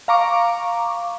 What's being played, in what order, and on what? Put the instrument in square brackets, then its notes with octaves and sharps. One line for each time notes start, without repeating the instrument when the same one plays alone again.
[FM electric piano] F5 A#5 C#6 D6